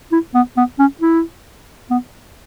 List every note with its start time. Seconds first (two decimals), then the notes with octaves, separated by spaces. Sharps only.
0.12 E4
0.34 B3
0.57 B3
0.79 C#4
1.01 E4
1.91 B3